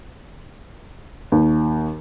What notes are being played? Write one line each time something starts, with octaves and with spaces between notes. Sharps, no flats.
D#2